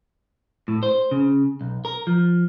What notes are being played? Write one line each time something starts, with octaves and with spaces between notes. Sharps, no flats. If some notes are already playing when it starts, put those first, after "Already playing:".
A2
C5
C#3
B1
A#4
F3